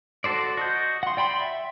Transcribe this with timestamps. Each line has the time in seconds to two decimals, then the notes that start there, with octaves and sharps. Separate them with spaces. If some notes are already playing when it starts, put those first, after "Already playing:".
0.24 F#4 A4 C5 D5
0.57 F#4 D#5 G6
1.03 F#5 C6
1.17 D5 G5 B5 C6
1.40 E5